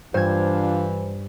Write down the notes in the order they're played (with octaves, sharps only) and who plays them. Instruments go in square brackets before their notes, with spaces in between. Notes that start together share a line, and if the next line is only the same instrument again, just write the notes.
[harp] G2 G#6 [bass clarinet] E3 [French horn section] D4 F4 [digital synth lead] C5